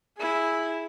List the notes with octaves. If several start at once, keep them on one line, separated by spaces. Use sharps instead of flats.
E4 G#4